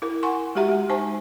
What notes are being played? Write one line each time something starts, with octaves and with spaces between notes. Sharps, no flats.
E4 A#4
F#5 G#5 C6 C#6
G#3 F#4 G4 E5 A#5
G#3
D#4 C5 G#5 A5